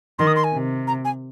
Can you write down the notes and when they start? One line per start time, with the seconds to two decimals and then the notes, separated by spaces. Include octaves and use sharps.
0.19 D#3 C6
0.27 D#6
0.36 C6
0.44 G#5
0.53 C3
0.87 A#5
1.05 G#5